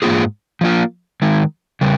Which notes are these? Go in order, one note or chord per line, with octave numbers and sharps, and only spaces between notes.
G#2 F3 A#3 F4 G#4
F3 A#3 F4
D#3 G#3 D#4
C#3 G3